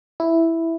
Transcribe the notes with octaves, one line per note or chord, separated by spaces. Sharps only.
E4